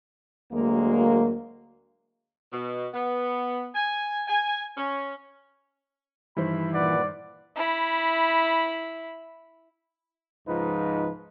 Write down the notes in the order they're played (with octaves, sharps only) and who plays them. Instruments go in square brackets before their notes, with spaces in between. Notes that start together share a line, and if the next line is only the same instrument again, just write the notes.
[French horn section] D2 F#3 G#3 A#3
[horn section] B2
B3
G#5
G#5
C#4
[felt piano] G2 D#3 C5 [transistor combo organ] E3 [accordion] B5
[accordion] A#2 B4 F#5 [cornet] D5
[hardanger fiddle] E4 B5
[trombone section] C#2 G#2 F3 D#4 F4 B4